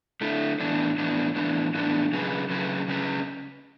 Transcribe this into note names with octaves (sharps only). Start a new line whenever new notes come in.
D3 A3 E4
A2 E3 B3 D4
A2 E3 B3 D4
A2 E3 B3 D4
A2 E3 B3 D4
C#3 F#3 C#4 G#4 B4
C#3 F#3 C#4 G#4 B4
C#3 F#3 C#4 G#4 B4